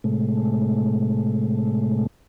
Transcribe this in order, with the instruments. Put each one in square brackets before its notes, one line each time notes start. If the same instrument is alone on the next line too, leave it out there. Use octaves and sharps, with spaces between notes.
[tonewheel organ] A2 C3 G#3 A3